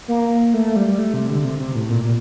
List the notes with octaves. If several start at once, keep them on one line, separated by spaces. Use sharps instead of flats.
A#3
A3
G3
G3
A3
C3
D3
C3
C3
A2
A#2
A#2